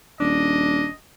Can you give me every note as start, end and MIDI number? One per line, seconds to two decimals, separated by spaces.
0.20 0.86 27
0.20 0.89 62
0.20 0.94 75